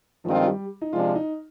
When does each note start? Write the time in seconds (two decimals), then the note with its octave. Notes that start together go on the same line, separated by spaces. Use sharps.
0.25 G2 D#3 F3 G#3 C4 F4
0.47 G3
0.82 D#4
0.93 C3 F3 G#3 D4 F4
1.15 D#4